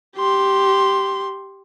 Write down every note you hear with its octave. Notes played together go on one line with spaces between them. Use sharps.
G4 C6